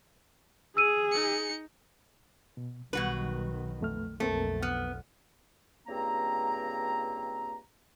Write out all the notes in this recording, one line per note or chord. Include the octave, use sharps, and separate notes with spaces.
G#4 E6 D#7
D#4 C#7
B2
B1 B2 D#3 G3 F#4 B4
F2 A3 F6
B1 F2 A3 A#3 C4 A#4
B3 F6
C#2 G2 A#3 C4 A#5